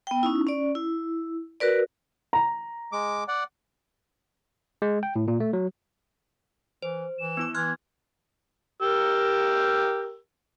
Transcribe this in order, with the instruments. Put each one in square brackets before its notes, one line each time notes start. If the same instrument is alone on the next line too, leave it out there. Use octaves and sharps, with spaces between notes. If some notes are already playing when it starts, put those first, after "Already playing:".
[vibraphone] B3 G5
C#4 D#4 E4
C#4 D5
E4
F#4 A#4 B4 D5
[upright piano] A#5
[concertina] G#3 D6
D5 F#5
[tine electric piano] G#3
G5
A2
A#2
A3
F#3
[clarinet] E3 [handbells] C5
[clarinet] E3 [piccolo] E7
[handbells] B3 E4 D6
[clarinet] E3 [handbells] C6 F6 F#6 [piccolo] G#6
[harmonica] G4 A#4 E6